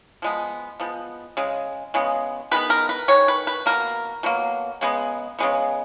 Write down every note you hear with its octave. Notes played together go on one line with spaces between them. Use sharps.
F3 G#3 B3
F3 G#3 B3
C#3 G#3
C#3 G#3 B3
D#3 G#3 B3 B4
A#4
B4
D#3 G#3 C#5
B4
B4
B2 F#3 A#3 A#4
B2 F#3 A#3
C#3 G#3 B3
C#3 G#3 B3